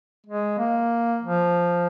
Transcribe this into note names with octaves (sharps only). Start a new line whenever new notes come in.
G#3
A#3
F3